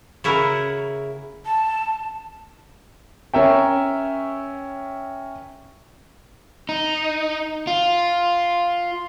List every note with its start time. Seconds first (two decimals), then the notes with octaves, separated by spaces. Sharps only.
0.24 C#3 E4 F#4 A#4
1.46 A5
3.34 C#4 A#4 E5 G5
6.69 D#4
7.67 F4